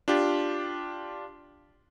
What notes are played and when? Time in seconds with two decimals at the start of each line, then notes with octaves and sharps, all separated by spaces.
0.08 D4 F4 G4